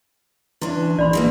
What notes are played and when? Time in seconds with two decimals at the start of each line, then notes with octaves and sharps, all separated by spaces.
0.62 E3 C#4 D4 E4 C6
0.99 A#1 D5 B5 C6
1.13 E3 G#3 A#3